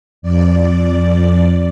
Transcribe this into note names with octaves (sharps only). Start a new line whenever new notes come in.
F2 D5